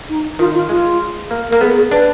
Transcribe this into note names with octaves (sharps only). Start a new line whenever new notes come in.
D#4
D#3 F4
F4
G#3 F4
A#3
A#3 A#4
B3 G#4
G#4
D4 B4